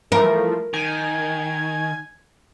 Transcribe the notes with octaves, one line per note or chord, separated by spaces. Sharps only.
E3 F3 A3 A#4
D#3 G#5